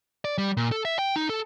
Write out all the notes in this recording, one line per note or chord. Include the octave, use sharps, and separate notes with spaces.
D5
G3
A#2
A4
E5
G5
D#4
A4